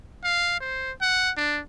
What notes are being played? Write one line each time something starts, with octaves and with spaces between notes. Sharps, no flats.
F5
C5
F#5
D4